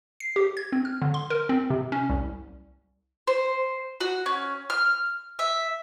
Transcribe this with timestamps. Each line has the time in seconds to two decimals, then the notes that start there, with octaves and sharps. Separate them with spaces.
0.20 C7
0.36 G4
0.57 G#6
0.72 C4
0.85 F6
1.02 D3
1.14 C6
1.30 A#4
1.49 C4
1.70 C3
1.92 C#4
2.10 C2
3.27 C5
4.00 F#4
4.26 C#4
4.70 F6
5.39 E5